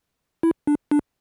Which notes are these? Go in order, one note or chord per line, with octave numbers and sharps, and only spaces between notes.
E4
D4
D4